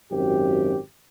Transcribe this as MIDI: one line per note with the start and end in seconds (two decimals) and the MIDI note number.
0.11 0.76 32
0.11 0.76 42
0.11 0.76 67